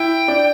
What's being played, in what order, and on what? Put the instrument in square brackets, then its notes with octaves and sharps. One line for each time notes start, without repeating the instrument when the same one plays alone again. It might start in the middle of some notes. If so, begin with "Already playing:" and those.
Already playing: [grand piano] E4 [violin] G5
[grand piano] D4